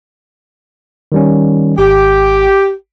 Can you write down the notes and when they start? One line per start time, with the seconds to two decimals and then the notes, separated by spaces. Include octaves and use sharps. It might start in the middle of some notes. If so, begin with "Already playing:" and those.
1.12 D#3 G3 C#4
1.78 G#1 G4